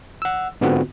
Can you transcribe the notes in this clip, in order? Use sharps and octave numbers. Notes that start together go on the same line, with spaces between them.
F#5 E6
G#2 D3 B3 C4 F4 F#4